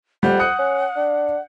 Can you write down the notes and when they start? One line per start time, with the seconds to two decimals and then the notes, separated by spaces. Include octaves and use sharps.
0.23 F2 G3 F#5 G6
0.39 D#6 F#6 C#7
0.59 C#4
0.96 D4